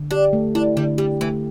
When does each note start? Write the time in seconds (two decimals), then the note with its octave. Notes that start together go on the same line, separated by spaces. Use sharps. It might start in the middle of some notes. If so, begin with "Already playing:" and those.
Already playing: D3
0.11 D4 G4
0.33 A3
0.55 D4 E4
0.77 D3 G3
0.98 G3 G4
1.21 E3 A3